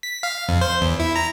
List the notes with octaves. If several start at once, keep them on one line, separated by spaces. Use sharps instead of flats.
B6
F5
F2
C5
E2
E4
A#5